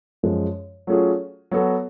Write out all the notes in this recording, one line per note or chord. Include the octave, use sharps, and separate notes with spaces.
F#2 F3 G#3
F#3 A3 C#4 F4 G#4
F#3 B3 F#4 A4